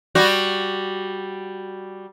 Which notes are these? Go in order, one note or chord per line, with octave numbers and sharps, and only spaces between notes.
G3 F#4